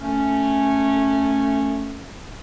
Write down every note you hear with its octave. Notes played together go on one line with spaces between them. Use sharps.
A3 C#4